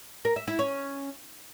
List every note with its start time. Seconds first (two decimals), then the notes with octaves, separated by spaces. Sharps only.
0.25 A#4
0.36 E5
0.47 E4
0.59 C#4